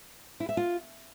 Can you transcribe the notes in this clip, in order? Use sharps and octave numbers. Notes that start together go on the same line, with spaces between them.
E4
E5
F4